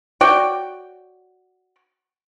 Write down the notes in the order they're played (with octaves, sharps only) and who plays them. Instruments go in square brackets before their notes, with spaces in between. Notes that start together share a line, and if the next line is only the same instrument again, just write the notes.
[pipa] F#4 C#5 D5 G5